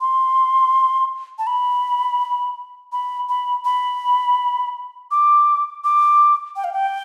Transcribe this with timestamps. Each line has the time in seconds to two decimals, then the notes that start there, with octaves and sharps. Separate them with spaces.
0.01 C6
1.39 A5
1.47 B5
2.92 B5
3.29 B5
3.65 B5
5.11 D6
5.84 D6
6.56 G5
6.64 F5
6.73 G5